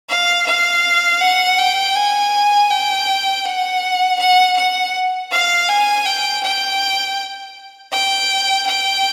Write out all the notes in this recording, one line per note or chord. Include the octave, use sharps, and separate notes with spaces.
F5
F5
F#5
G5
G#5
G5
F#5
F#5
F#5
F5
G#5
G5
G5
G5
G5